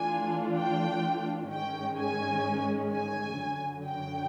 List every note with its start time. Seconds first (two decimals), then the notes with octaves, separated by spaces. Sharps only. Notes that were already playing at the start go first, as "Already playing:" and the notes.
Already playing: E3 A3 D4 F4 G#5
0.58 G5
1.51 G#2 D#3 G#3 C#4 G5
1.98 G#5
2.92 G#5
3.39 F#2 D3 F#3
3.85 G5